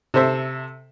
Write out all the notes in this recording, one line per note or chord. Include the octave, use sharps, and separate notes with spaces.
C3 A4 C5 E5